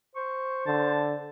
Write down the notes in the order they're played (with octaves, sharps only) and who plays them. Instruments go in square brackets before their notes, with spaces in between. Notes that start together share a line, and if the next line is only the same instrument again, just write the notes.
[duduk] C5 [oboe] C#6
[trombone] D3 [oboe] A5